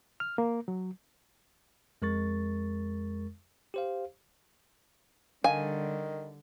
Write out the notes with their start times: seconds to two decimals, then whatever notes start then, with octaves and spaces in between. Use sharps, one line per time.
0.20 F6
0.38 A#3
0.68 F#3
2.02 F2 G#3 A#4 C#6 A6
3.74 G4 C5 F5
5.44 D3 D#3 G3 F5 G#5